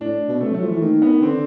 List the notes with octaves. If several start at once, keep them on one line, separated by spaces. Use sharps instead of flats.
A2 D4
B2
C3 A3
F#3 A3
F3
E3 A3
D#3 A#3
B3
D3 C4